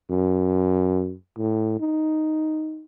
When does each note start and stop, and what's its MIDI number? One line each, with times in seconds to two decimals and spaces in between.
0.10 1.15 42
1.38 1.78 45
1.80 2.85 63